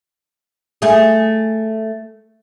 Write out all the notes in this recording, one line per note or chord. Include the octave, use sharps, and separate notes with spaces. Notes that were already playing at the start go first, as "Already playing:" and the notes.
A3 G#4